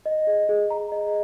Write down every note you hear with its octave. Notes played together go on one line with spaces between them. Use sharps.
D#5
G#4
G#4
A#5
D#5